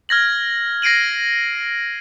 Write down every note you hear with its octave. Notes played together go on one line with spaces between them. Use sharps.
F6 G#6 A#6 F#7
A#6 C7 D7 D#7 F#7